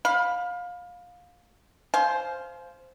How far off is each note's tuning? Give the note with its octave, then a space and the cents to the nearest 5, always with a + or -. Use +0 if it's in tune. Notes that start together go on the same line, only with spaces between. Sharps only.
F5 +25 B5 +0
C5 +0 F5 -5 G#5 +40